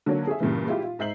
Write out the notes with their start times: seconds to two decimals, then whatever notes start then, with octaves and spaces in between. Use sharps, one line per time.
0.06 D3 F#3 A#3 D4 C#5
0.27 G#4 A4 E5
0.40 G2 A#2 C#3 E3
0.67 G#3 E4 F4 G4
0.84 F4
0.99 G#2 E5 G6 C7 F#7